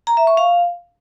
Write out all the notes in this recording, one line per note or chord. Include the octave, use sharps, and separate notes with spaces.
A#5
E5
C#6
F5